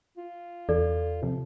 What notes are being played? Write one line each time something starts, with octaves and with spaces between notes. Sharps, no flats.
F4
E2 A4 D5
C3 F3